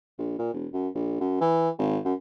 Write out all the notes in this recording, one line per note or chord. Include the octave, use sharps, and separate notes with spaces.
A#1
A#2
E1
F#2
A#1
F#2
E3
G#1
F#2